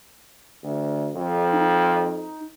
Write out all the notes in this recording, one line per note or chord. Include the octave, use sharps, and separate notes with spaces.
D2
F2
D#4